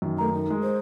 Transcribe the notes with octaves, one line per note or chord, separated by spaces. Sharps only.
F#2 D#3
A3 A4 A#4 A#5
D#4
G#3
C5